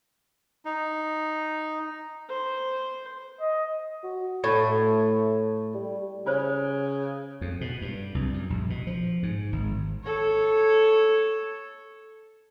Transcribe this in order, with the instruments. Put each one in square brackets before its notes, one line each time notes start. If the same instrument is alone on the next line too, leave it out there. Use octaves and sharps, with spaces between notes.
[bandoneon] D#4
[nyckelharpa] C5
[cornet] D#5
[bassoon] F#4
[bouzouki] A2
[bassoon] A3
G3
[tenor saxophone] C#3 [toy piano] F4 C5 C#5
[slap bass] F2
B2
G2
C2
F#2
A#1
B2
F3
G#2
G#1
[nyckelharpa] A4 C#5